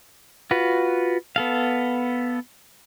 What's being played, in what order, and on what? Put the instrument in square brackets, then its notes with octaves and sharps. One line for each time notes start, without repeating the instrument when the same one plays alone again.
[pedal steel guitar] F4 F#4 B4
B3 A4 F5